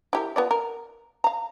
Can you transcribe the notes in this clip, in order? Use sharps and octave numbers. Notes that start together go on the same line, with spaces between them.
E4 G4 A#4
B3 F4 D5
A#4
F5 A#5